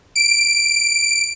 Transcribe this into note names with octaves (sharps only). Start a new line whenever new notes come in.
D7